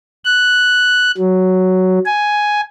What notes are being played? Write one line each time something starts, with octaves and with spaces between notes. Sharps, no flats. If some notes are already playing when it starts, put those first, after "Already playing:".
F#6
F#3
G#5